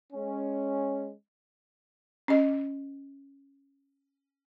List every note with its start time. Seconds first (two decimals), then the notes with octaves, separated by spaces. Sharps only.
0.13 G#3 C#4
2.28 C#4 D#5